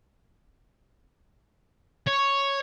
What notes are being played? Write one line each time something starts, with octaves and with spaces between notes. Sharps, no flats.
C#5